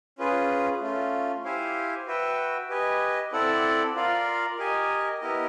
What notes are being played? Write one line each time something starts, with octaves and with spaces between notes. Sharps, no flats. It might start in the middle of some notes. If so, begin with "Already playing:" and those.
C#4 F4 G#4 B4
A3 C#4 F4
E4 G4 C5 F5 G#5
F#4 B4 E5 G5
G4 B4 D#5 G#5
C4 E4 A4 D5 F#5
F4 A#4 D5 F5
G4 A#4 D#5 G#5
B3 E4 G4 A#4 D#5